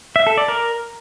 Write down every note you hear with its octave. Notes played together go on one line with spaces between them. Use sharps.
E5
A4
D5
A#4